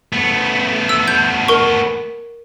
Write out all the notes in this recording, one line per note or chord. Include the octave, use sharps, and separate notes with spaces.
A3 B3
E6
G6
A#4 C#6